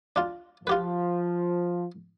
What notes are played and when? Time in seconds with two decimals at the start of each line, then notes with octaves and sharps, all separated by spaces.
0.16 D4 F4
0.67 F3 F4 G4 B4